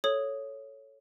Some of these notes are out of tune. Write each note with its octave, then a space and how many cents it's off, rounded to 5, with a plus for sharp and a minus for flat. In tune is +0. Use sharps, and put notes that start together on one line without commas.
A4 -5 C#5 +0 D#6 +0